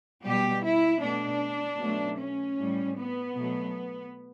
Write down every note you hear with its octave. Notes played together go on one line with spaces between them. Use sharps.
B2 G3 G4
E4
B2 A3 D4
B2 F#3 A3
C#4
A2 G3
B3
B2 F#3 A3